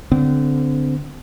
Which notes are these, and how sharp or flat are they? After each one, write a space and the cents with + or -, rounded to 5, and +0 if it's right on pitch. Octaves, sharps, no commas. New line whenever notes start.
D3 -20 C4 -40